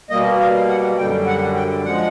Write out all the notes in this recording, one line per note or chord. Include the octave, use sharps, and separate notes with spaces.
B2 G3 A#3 D#5
F5
F#5
F#2 D3 G3 G5
F#5
G5
F3 G#3 F#5